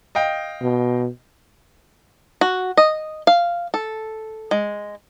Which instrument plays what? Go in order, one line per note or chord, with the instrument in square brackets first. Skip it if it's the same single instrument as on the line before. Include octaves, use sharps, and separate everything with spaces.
[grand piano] D#5 F5 G5
[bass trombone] B2
[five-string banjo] F#4
D#5
F5
A4
G#3